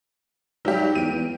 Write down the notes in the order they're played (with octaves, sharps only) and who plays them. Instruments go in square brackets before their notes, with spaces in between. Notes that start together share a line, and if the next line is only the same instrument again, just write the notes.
[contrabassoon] G#2 [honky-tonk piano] F#3 G3 G4
[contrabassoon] E2 [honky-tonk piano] D7 D#7
[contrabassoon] E2